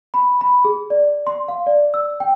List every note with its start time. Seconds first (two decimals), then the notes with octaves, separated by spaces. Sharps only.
0.14 B5
0.41 B5
0.65 G#4
0.90 D5
1.27 C6
1.48 F5
1.66 D5
1.94 E6
2.20 G5